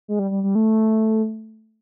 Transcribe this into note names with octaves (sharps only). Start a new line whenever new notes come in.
G#3
G3
G3
G3
A3